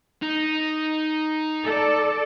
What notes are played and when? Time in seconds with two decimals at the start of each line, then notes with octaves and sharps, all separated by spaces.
0.22 D#4
1.65 A4 D5